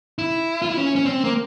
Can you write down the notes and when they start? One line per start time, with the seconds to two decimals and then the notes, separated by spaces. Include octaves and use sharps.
0.18 E4
0.62 F4
0.69 E4
0.77 C#4
0.96 C#4
1.06 C4
1.24 A#3